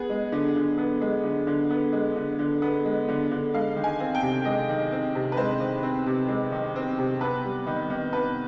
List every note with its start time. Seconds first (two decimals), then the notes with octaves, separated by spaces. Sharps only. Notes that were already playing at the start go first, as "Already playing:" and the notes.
Already playing: B3 G#4
0.10 G#3
0.32 D3
0.56 D3
0.78 B3
1.01 G#3
1.24 D3
1.47 D3
1.70 B3
1.93 G#3
2.16 D3
2.39 D3
2.62 B3
2.85 G#3
3.08 D3
3.31 D3
3.54 G#3 F5
3.76 D#3
3.84 G#5
4.00 C4
4.15 G5
4.22 C3
4.45 G#3 D#5
4.69 D#3
4.92 C4
5.15 C3
5.32 B4
5.37 G#3 C5
5.60 D#3
5.83 C4
6.06 C3
6.29 G#3
6.52 D#3
6.76 C4
6.99 C3
7.21 B3 B4
7.45 G3
7.67 D#3
7.90 D#3
8.12 B3 B4